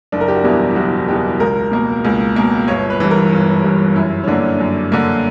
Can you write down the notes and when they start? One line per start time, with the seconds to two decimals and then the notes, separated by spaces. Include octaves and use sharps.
0.12 F#1 D4
0.21 A#4
0.28 G4
0.36 F#4
0.44 E2 B2 G3 E4
0.76 F#1 F#4
1.08 E2 B2 G3 G4
1.40 C#2 A#4
1.71 B2 A#3
2.05 C#2
2.36 B2 A#3
2.68 G1 C#5
2.90 B4
3.00 G2 E3
3.11 A#4
3.32 G1
3.64 G2 E3
3.96 F#2 E4
4.23 C#4
4.28 D3 A#3 D4
4.60 F#2
4.92 D3 A#3